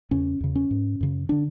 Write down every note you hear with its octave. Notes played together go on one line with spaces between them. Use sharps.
E2 C#3 C#4
E2 C#3
C#4
G#2
F#2 C#3
D3 D4